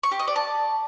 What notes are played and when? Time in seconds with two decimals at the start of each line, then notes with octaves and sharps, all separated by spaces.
0.03 C#6
0.11 G4
0.20 D#5
0.28 D5
0.36 A5